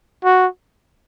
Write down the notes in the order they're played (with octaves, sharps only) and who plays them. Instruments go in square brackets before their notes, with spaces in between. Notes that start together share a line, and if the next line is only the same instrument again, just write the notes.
[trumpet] F#4